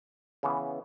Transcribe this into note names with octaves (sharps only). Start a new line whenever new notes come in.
C#3 E3 B3